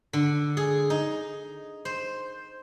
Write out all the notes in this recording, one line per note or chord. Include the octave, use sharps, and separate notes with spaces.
D3
G#4
D#4
C5